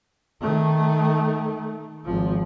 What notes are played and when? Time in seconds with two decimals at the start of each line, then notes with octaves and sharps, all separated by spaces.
0.41 D#3 A3
2.05 G#1 F3